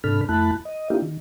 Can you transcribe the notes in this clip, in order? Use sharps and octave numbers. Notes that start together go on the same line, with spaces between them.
G#2 C3 D4 A4 B5 F6
F2 A3 E4 A5 B5 F#6
D#5
A#3 D4 E4 F4 G4
D#3